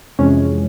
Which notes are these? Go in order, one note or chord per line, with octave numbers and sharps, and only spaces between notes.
F2 C3 E3 G#3 C#4